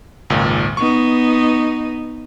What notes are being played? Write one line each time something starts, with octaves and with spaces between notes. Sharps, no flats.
G#1 C#2 A#2
B3 D#4 C#6